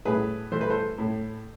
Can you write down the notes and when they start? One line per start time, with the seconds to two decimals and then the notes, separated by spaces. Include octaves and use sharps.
0.05 A2 G#4 B4
0.52 E3 A3 C5
0.61 B4
0.70 A4 C5
0.98 A2